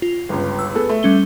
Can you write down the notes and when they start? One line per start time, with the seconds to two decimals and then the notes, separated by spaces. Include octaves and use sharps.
0.02 F4
0.29 G1 C#2
0.59 E6
0.75 B3 G#4 A4
0.89 A3
1.03 G3 C#4 G7